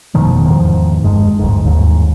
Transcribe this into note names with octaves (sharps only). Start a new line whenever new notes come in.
F1 B2 D#3 F3
E2 G#2 D#3 F3
F#1 G2 G#3
D1 G1 G#2
G1 D#2 G#2